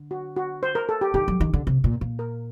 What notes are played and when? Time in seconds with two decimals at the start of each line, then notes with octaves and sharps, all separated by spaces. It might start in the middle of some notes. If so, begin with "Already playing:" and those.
Already playing: D3
0.11 F#4
0.36 F#4
0.63 C5
0.75 A#4
0.89 A4
1.01 G4
1.14 D#3 G4
1.28 F#3
1.41 D#3
1.53 D3
1.67 C3
1.84 A#2
2.01 A#2
2.19 A#4